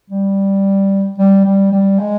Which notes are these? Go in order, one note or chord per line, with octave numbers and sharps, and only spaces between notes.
G3
G3
G3
G3
G#3